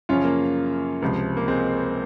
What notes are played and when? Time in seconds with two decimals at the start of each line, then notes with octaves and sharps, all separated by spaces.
0.09 F#2 C#3 F3 C#4 F4
0.25 A#3
1.02 C#2 C3 F3
1.37 A#3
1.48 G#3 C4